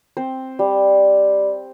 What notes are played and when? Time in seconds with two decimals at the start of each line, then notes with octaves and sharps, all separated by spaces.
0.17 C4 C5
0.59 G3